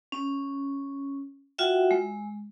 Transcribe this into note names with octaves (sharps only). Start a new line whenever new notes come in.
C#4
F4 F#4 E5 F#5 G5
G#3